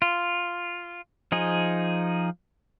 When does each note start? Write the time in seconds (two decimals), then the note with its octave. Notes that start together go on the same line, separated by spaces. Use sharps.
0.02 F4
1.32 F3 D#4 G#4